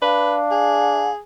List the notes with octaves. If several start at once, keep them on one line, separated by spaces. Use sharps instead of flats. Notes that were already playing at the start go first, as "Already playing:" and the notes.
D4 B4 F5
G#4